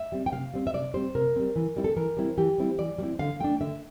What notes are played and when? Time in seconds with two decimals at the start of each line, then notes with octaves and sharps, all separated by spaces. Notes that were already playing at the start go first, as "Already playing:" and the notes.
Already playing: E5
0.12 G3 C4
0.26 G5
0.33 C3 F5
0.54 G3 C4
0.67 E5
0.74 C3 D5
0.94 G3 C4 C5
1.15 C3 A#4
1.36 G3 C4
1.56 E3
1.76 G3 C4 E4
1.84 A4
1.96 E3 A#4
2.17 G3 C4 E4
2.38 E3 G4
2.58 G3 C4 E4
2.78 E3 D5
2.98 G3
3.02 C4 E4
3.19 D3 F5
3.40 A3 D4 G5
3.61 D3 E5